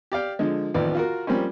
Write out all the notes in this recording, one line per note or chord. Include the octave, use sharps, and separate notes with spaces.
G4 D5 F5 G5
D3 F3 G#3
A1 D#2 F3 B3 D5
F4 F#4 A#4
F3 G3 A#3 C4 C#4